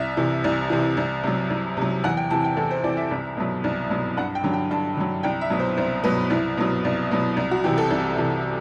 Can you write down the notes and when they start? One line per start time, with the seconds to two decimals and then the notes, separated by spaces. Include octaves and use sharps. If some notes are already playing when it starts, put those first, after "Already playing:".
Already playing: C2 E5
0.17 C3 E3
0.44 C2
0.70 C3 E3
0.97 C2
1.23 C3 F#3
1.50 C2
1.77 C3 F#3
2.04 E2 F#5
2.17 G5
2.30 C3 E3 A5
2.44 G5
2.57 E2 A4
2.71 C5
2.84 C3 E3 D5
2.97 E5
3.11 C2
3.37 B2 F#3
3.64 C2
3.90 B2 F#3
4.17 G2 F#5
4.35 G5
4.44 D3 F#3
4.53 G5
4.71 G2 A5
4.97 D3 F#3
5.23 C2 G5
5.41 E5
5.50 B2 F#3
5.59 C5
5.77 C2 C5
6.04 B2 F#3 B4
6.30 C2 E4
6.57 B2 F#3
6.85 C2
7.11 B2 F#3
7.37 C2
7.51 F#4
7.64 C3 E3 G4
7.78 A4
7.91 C2
8.18 C3 E3